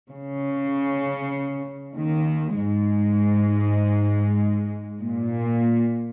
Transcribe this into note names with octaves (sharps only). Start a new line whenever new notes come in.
C#3
D#2 D#3
G#2 G#3
A#2